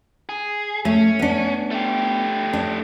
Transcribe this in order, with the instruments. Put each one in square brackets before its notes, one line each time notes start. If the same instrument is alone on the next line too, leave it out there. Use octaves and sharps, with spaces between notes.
[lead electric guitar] G#4
[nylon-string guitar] A3 [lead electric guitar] C#4
[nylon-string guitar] B3 D4
[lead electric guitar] A3 G4
[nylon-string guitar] D4